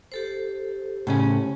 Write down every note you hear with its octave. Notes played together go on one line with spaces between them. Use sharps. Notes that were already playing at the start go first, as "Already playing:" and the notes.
G4 A4 C5
A2 C#3 C#4